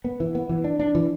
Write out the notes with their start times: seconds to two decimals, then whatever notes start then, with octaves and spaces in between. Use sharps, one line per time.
0.04 B3
0.20 E3
0.35 B3
0.49 E3
0.64 D4
0.79 D4
0.95 E3